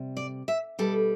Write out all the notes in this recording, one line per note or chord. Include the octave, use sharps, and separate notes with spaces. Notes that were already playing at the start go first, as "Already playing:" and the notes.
Already playing: C3 G3
D5
E5
B2 G3 A4